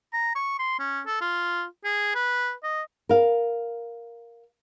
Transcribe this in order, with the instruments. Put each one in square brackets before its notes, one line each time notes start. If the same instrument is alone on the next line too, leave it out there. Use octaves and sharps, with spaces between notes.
[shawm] A#5
C#6
C6
C#4
A4
F4
G#4
B4
D#5
[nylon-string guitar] A#4 F5